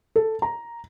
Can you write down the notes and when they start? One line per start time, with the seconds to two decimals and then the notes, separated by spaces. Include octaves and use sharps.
0.16 A4
0.42 A#5